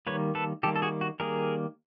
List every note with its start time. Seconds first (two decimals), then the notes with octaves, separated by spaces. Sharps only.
0.07 D#3 G3 A#3 B4 C#5
0.35 A4 B4
0.63 D#3 G3 A#3 G4 A4
0.76 A4
0.82 F#4 G#4
1.01 F#4
1.20 D#3 G3 A#3 G#4 A#4